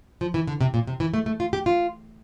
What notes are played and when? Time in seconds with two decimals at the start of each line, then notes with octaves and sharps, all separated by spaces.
0.21 F3
0.34 E3
0.47 D3
0.61 C3
0.74 A#2
0.87 C3
1.00 E3
1.14 A3
1.26 A3
1.40 F4
1.53 G4
1.66 F4